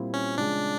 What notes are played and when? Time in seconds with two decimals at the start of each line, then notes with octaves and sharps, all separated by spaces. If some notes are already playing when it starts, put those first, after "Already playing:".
Already playing: A#2 G3 C4 E4
0.14 C#4
0.37 C#3 F3 G#3 D4